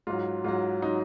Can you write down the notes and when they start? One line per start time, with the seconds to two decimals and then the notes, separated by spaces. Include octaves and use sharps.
0.07 G#2 F#3 F4
0.44 G#2 F#3 F4
0.82 F#3 D#4